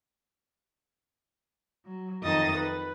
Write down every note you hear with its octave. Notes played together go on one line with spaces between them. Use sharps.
F#3
F2 D#3 D#5 D#6 A6
B4